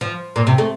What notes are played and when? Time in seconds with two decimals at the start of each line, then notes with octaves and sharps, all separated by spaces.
0.01 F3
0.36 A#2
0.47 C3
0.58 A3